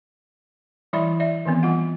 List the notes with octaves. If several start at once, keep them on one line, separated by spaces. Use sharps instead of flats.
E3 G3 E4 D5 E5 B5
D5 E5
D#3 E3 B3 C4
G3 F4 F#5